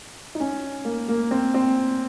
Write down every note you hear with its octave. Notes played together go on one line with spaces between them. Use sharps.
D#4
C#4
A#3
A#3
C4
C4